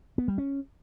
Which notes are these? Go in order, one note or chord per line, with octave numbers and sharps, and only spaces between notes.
B3
G3
C#4